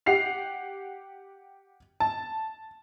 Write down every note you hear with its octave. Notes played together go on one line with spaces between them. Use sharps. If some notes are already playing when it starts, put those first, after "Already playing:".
G4 F#5 C7 F7
A5